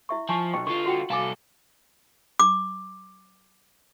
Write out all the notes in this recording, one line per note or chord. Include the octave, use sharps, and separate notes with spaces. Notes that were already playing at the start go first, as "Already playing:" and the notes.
E4 E5 C#6
F3 G#5 A5 C#6
B1 D#5 G5 C#6
D3 F4 C#6
F#4 F#5 G5
C2 A4 F5 G#5 D6
D6